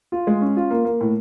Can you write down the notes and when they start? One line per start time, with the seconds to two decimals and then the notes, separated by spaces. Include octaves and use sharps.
0.12 F4
0.27 G#3
0.41 C#4
0.57 F4
0.70 A#3
0.85 A#3
1.01 A2